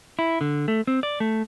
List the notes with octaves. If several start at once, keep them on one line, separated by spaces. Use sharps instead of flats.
E4
D3
A3
C4
D5
A3